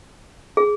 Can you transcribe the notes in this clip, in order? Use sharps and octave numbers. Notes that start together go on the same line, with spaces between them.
G#4